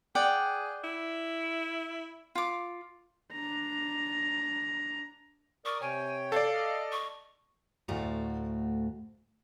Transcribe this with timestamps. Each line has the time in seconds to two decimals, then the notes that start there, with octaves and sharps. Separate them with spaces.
0.15 G#4 D5 F#5 G5
0.84 E4
2.35 F4 D6
3.32 D4 A#5
5.65 A#4 D5 C#6 D#6
5.81 C3 C#5 G5 G#5
6.32 A4 D5 F5
6.54 D#5 F6
6.92 C#6
7.88 D2 A2 A3 F#4 F5 A#5